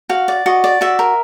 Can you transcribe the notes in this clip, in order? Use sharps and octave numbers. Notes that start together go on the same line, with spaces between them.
F#4 F5
D5
F#4 D#5
D5
F#4 E5
A#4